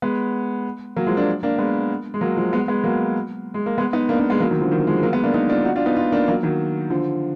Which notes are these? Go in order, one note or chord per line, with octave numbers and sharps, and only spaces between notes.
G#3 B3
F#3 A#3
F3 G#3
A#3 D4
A#3 D4
G#3 B3
G#3
F#3 A#3
F3 G#3
G#3 B3
G#3 B3
F#3 A#3
G#3
A#3
G#3 B3
B3 D#4
A#3 D4
A#3 D4
G#3 B3
F#3 A#3
D#3 F#3
D3 F3
D#3 F#3
F3 G#3
G#3
F#3 A#3
G#3 B3
A#3 D4
B3 D#4
D4 F4
D#4 F#4
D4 F4
B3 D#4
D4 F4
A#3 D4
F#3 A#3
D#3 F#3
D3 F3